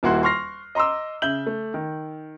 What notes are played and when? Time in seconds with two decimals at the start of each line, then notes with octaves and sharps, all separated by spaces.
0.03 D#1 A#3 E4 F#4 C6 F#6
0.23 C6 C#6 F6 A#6 C7
0.75 D#5 A#5 C6 D6 E6
1.22 C#3 E5 G6 F#7
1.47 A3
1.74 D#3